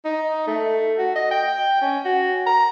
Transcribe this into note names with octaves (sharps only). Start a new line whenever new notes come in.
D#4
A3
F#4
D#5
G5
C#4
F#4
A#5